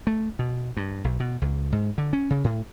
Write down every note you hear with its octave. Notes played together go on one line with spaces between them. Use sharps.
A3
B2
G2
B1
B2
C#2
G#2
D3
C#4
C#3
A2